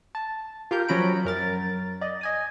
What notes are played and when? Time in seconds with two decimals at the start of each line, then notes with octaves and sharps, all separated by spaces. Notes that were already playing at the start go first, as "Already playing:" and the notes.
0.15 A5
0.71 F4 G4 A#4 G6
0.88 F3 F#3 C#4 A#5 B5 D7
1.25 F#2 A#4 A6
2.01 D5 D#5
2.21 D#5 G#5 D#6